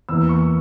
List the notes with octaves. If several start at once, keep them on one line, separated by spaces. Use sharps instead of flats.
E2 E3 A#3 E6
C#6